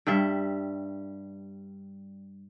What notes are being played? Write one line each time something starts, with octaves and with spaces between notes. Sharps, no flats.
G2 G3 E5